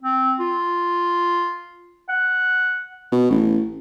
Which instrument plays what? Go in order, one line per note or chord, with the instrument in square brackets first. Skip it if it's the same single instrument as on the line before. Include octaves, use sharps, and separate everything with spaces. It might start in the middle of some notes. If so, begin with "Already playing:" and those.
[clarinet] C4
F4
F#5
[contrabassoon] B2
A1